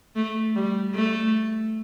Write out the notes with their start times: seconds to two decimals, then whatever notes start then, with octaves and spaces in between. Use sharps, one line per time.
0.16 A3
0.55 G3
0.94 A3